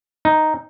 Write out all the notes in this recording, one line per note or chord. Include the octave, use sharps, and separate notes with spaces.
D#4